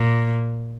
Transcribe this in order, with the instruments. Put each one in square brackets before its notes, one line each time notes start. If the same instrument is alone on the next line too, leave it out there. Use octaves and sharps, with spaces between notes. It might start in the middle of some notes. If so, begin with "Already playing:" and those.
Already playing: [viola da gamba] A#2